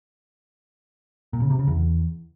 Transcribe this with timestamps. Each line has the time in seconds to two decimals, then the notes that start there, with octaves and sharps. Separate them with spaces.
1.33 A#2
1.42 C#3
1.50 C3
1.59 C#3
1.67 E2